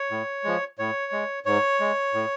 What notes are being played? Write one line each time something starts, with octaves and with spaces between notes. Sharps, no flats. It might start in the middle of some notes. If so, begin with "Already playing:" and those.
Already playing: C#5
A2
F3 G#3
A2 C#5
G#3
G#2 C#5
G#3
A2